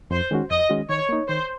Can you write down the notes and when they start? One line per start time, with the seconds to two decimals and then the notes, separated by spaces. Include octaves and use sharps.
0.11 F2 C5
0.31 D#3 G#3 C#4 F#4
0.50 F2 D#5
0.70 D#3 G#3 C#4 F#4
0.89 D#3 C#5
1.09 A#3 D#4
1.28 D#3 C5